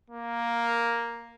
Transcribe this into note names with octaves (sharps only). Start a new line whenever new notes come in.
A#3